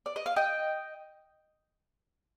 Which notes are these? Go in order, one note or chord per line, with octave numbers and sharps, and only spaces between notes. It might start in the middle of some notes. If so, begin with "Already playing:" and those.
D5
D#5
F5
D#5 G5